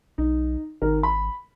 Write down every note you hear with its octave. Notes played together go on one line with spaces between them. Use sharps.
B1 D#4
G#1 D#3 A#4
B5